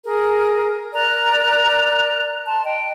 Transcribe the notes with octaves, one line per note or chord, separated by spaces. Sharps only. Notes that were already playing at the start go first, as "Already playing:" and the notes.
G#4 A#4
A#4 D5 A#5 F#6
A5 C6
D#5 G5